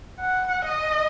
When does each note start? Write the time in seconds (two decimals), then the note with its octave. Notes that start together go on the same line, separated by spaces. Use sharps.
0.20 F#5
0.65 D#5